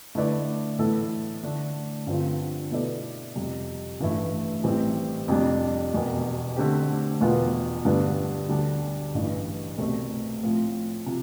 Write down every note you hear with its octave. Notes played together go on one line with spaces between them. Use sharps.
D3 A3 E4 B4 D5
A2 E3 B3 E4 A4
D3 A3 D4
G2 D3 F3 C4 F4
B2 B3 E4 A4 D5
F2 C3 G3
A1 G2 E3 A3 E4
A1 A2 E3 G3 C4
F2 C3 G3 D4
E1 E2 B2
D3 A3 C4 G4
E1 E2 B2 B3 F4
G2 D3 G3 B3 D4
D2 D3 G3 D4
A1 G2 E3
C2 B2 A3 C4 G4
A2 F3 C4 F4
C3 F3